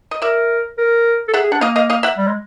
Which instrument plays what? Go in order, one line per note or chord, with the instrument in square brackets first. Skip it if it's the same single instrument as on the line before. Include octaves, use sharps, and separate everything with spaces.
[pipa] D#5
[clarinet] A#4 [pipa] D5 E5
[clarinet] A#4
A4
[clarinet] G#4 [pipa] E5 F#5
[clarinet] G#4
[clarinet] D4 [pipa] F#5
[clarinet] A#3 [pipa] D#5 F5
[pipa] D#5 F5
D#5 F5
E5 F#5
[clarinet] G3
G#3